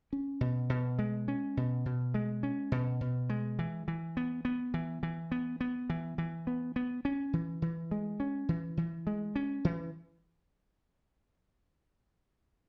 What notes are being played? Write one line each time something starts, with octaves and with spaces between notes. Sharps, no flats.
C#4
B2
B2
G#3
C#4
B2
B2
G#3
C#4
B2
B2
G#3
E3
E3
B3
B3
E3
E3
B3
B3
E3
E3
B3
B3
C#4
E3
E3
G#3
C#4
E3
E3
G#3
C#4
E3